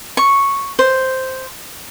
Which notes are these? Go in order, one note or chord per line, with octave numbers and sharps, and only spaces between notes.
C#6
C5